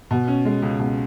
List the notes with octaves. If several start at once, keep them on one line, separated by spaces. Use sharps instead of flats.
B2
C#4
G#3
C#2
B2